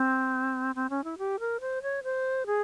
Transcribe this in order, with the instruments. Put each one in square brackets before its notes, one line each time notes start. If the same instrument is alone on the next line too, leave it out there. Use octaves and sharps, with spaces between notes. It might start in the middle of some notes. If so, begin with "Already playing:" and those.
Already playing: [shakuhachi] C4
C4
C#4
E4
G4
A#4
C5
C#5
C5
G#4